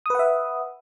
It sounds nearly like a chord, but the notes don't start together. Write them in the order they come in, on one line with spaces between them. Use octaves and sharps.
D#6 B4 F#5 E5